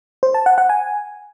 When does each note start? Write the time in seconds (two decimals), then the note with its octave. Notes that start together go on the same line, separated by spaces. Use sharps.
0.23 C5
0.34 A5
0.46 F#5
0.58 F#5
0.69 G#5